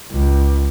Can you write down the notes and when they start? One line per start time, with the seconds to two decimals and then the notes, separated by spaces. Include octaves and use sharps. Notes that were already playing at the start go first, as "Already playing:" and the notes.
0.12 C#2